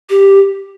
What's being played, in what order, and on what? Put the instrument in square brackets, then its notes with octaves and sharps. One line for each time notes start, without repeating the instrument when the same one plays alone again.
[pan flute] G4